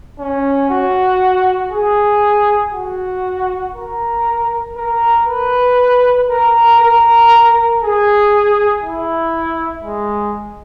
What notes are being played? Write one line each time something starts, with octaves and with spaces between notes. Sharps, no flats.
C#4
F#4
G#4
F#4
A#4
A#4
B4
A#4
A#4
G#4
E4
G#3